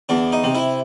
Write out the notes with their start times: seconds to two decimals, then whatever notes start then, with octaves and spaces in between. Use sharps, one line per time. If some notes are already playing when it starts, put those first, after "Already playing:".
0.09 E2 D4
0.32 D#4
0.44 C3
0.55 E4